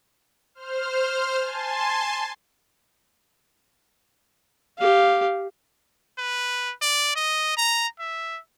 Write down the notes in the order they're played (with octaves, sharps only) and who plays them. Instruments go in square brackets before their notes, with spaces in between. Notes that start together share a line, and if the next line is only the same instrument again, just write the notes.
[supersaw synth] C5 F6
G#5 A5 C6
[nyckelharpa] G4 F5
[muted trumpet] B4
D5
D#5
A#5
E5